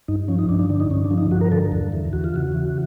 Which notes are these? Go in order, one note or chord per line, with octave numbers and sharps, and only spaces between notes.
G2 D#4
F3 C#4
D#4
G2 D4
D4
D3 D4
D#4
G2 C#4
D4
F3
D#4
G2 F#4
A#4
D3 A4
E2
E3
E2 F#4
F4
C#3 F#4
E3